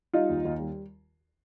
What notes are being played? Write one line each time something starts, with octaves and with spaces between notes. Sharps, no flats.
G3 D#4 F4
D#2
D#2
G3